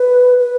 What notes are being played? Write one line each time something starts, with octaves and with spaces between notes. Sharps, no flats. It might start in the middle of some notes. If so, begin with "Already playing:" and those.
Already playing: B4
B4